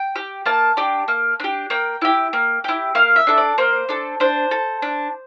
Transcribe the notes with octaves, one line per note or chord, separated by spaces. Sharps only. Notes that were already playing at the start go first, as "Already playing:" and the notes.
Already playing: G5
G4
A#3 A5
D4 G4
A#3
D4 G4
A#3 G5
E4 G4
A#3
E4 G4
A#3 F5
E5
D4 A4
D5
A#3 C5
D4 A4
D4 C5
A4
D4